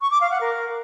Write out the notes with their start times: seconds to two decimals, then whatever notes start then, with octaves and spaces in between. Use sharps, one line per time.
0.01 C#6
0.11 D6
0.21 F5
0.31 F#5
0.41 A#4